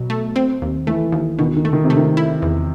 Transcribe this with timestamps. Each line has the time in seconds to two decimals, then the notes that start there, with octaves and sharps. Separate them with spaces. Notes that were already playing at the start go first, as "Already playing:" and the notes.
Already playing: B2 F#3
0.10 A3
0.36 C4
0.62 D#2
0.87 E3 A3
1.12 D#2
1.39 B2 D#3
1.56 D#3
1.65 A3
1.73 D#3
1.84 C3
1.90 A3
1.97 D#3
2.17 E4
2.42 E2